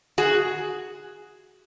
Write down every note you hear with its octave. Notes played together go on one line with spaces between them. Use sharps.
F#4 G#4